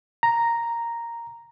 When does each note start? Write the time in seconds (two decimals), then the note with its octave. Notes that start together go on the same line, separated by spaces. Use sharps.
0.23 A#5